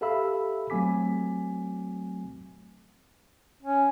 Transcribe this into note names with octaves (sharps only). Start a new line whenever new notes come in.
G4 A4 E5 F5 B5 E6
F#3 A3 C4 G#5 D6 B6
C#4